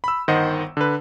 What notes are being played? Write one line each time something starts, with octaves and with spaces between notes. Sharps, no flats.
B5 E6
G1 D#3 C5 D#5 F#5
D3 B4